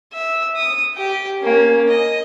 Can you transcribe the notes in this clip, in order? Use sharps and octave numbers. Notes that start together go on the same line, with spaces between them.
E5
D#6
G4 G5
A#3 C#4
D#5